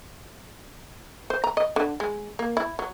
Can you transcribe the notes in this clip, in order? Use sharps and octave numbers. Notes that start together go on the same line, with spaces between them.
C5
A#5
D#5
D3
G#3
A#3
E4
F#3